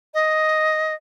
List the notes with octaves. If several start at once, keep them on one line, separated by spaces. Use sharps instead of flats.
D#5